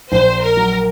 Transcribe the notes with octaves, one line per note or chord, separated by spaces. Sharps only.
A#1 C5
A#4
F#3